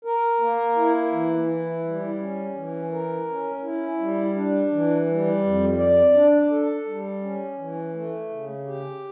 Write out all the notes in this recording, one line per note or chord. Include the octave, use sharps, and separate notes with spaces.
A#4
A#3
E4
E3
E4
G3
C#4
E3
A#4
C#4
E4
G3
D4
E3
G3
F2
D5
D4
A4
G3
C#4
E3
A3
C#3
G4